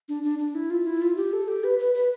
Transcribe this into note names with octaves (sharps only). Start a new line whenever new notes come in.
D4
D4
D4
E4
F4
E4
F4
G4
A4
G4
B4
B4
B4